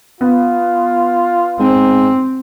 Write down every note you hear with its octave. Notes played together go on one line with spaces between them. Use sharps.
B3 F4
G#2 C4